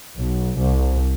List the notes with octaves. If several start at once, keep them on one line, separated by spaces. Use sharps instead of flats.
B1
C2